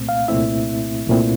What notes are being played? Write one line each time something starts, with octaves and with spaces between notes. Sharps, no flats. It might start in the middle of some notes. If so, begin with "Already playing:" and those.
Already playing: C2 A#2 A3 C4
F5
C2 A#2 A3 C4 E4 E5
C2 A#2 A3 C4 E4